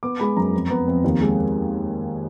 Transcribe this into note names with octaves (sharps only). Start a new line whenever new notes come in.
B3 D6
G#3 B5
F#2 A#5
F2
B3
F2
D#2
G#3